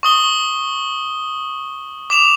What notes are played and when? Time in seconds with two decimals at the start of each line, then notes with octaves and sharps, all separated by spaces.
0.03 C#6 D#6 G7
2.10 D6 E7 F7